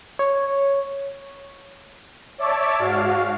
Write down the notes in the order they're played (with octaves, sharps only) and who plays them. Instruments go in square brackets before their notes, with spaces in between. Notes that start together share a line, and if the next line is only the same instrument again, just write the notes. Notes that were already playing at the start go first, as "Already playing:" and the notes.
[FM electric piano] C#5
[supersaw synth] C#5 D5 E5 A5 D6
G#2 F#4 F5